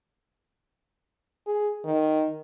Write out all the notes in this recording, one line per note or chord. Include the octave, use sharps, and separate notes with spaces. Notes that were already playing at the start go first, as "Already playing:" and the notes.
G#4
D#3